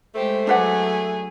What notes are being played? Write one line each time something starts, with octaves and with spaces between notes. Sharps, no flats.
G#3 A3 G4 C5
F#3 D4 G#4 B4 F#5